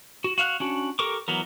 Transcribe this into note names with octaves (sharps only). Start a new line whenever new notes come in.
F#4
F#4 F5 F#6
C#4 D4 F#4
G4 A4 A#4 C#6 D6
E3 F#3 B3 A#4